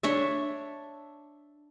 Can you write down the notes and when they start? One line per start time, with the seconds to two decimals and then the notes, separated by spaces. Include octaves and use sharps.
0.03 D4 C#5 E5